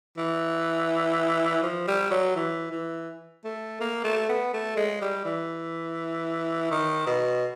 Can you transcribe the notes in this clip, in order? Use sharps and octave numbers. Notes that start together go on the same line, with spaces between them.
E3
F3
G3
F#3
E3
E3
A3
A#3
A3
B3
A3
G#3
G3
E3
D#3
B2